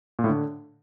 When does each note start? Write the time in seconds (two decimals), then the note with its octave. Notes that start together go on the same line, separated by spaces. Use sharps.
0.19 A#2
0.24 A2
0.29 D3